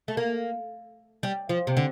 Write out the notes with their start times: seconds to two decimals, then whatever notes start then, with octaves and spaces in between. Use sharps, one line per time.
0.08 A3
0.17 A#3
1.23 G3
1.49 F3
1.67 C3
1.77 D3